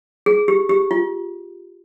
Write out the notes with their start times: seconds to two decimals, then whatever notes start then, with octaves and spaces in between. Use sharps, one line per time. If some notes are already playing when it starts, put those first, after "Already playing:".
0.26 G#4
0.48 G4
0.69 G4
0.91 F4